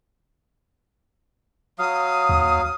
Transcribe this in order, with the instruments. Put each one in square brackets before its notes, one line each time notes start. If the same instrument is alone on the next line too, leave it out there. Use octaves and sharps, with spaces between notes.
[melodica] F#3 F5 [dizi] D#6
[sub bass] D#2